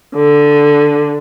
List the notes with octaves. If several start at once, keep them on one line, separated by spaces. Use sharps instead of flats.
D3